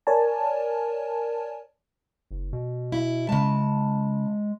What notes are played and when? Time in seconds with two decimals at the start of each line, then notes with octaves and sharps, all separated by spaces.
0.07 A#4 C#5 D5 G#5 A5
2.31 F#1
2.53 B2
2.92 E4
3.29 C#3 G#3 A5